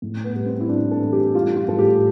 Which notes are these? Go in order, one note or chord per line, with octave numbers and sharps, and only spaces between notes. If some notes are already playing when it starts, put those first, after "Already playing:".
A2
B3
G3
C4
E4
A2 D4
A4
E3
G4
G3 F4
F4
A2 A4
G4